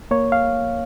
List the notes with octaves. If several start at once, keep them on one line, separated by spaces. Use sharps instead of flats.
A#3 C#5
F5